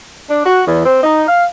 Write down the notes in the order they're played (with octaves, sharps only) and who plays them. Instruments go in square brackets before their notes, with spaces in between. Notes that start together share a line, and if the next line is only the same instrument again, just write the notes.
[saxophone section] D4
F#4
E2
C4
D#4
F5